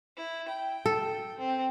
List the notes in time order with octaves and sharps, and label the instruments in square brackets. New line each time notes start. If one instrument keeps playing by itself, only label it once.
[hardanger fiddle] E4
G5
[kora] A4
[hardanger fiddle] C4